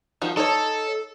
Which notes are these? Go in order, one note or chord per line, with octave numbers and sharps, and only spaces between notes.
D#3 F3 F#4
D#4 A4 C#5